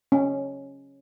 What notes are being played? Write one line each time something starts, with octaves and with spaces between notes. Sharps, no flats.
C#4